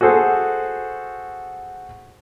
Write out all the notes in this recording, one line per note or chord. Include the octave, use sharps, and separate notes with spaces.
F#4 G#4 A4 C5 F#5